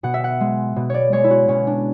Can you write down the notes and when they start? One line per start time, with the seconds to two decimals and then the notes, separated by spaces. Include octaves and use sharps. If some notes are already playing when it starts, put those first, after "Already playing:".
0.03 B2 F#5
0.14 E5
0.24 F#5
0.40 G#3
0.76 B2
0.90 C#5 D5
1.13 G#3 C#5
1.24 E4
1.30 F#4
1.48 B2 C#4
1.67 D4